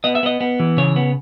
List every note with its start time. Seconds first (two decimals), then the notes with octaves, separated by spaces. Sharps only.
0.04 B3 D#5
0.15 E5
0.23 B3 D#5
0.41 B3
0.60 E3
0.77 C#3 C#5
0.96 B3